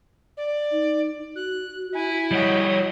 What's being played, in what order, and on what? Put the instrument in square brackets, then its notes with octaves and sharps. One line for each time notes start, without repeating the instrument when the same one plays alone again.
[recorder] D5
[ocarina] D#4
[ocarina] F#4 [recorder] F#6
[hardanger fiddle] E4 [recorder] G#5
[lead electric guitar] G3 F#4 [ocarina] C#5 [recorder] D#5